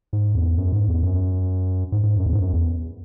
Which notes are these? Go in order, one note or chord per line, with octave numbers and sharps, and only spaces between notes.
G#2
E2
F#2
G#2
E2
F#2
G#2
G#2
F#2
E2
G#2
F#2
E2